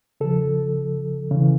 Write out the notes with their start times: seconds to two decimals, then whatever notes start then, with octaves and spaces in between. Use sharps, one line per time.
0.21 C#3 F3 A4
1.31 C#3 E3